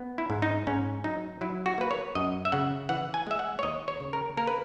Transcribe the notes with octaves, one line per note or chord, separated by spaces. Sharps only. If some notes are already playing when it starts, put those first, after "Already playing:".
Already playing: B3
E4
G#2
D#4
G#2 C#4
F#3 D#4
F#3 E4
F#4
A#3 B4
C#5
F#2 D#5
E5
C#3 F#5
E3 F#5
G#5
G#3 E5
F#5
C#5
D#2 D#5
C#5
C#3
A#4
A#3 A#4
B4